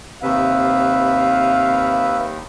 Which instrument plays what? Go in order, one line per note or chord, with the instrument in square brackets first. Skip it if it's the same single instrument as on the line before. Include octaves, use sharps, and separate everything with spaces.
[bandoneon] D#2 [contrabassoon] C3 [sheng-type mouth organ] B4 E5 [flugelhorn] F5